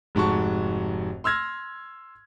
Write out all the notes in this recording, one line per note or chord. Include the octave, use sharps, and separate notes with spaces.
F1 G#2 F#4 A5 C#6
C6 E6 F6 G#6 A#6